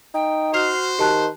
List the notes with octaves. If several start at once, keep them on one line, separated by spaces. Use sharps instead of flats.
D#4 G5
F#4 C5 F6 C7 F7
D#3 G4 A5 F#6